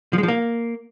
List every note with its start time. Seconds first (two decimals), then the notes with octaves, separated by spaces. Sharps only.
0.13 F3
0.18 G#3
0.23 F3
0.28 A#3